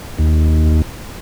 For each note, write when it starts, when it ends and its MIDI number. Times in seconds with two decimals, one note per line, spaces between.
0.18 0.82 39